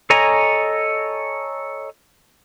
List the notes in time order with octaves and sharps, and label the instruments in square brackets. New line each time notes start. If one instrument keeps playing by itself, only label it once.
[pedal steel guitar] A4 C#5 D#5 G#5 A#5